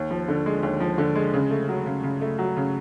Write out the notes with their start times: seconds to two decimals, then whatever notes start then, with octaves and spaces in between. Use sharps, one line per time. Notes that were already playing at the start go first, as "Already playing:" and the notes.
Already playing: D#2
0.11 F3
0.28 D3
0.46 G#3
0.63 D#2
0.80 F3
0.98 D3
1.15 G#3
1.34 C#3
1.51 A3
1.69 F#3
1.86 C#3
2.03 C#3
2.21 A3
2.39 F#3
2.57 C#3